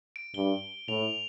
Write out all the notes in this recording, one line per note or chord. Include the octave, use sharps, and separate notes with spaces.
D7
G2 G7
A2 F7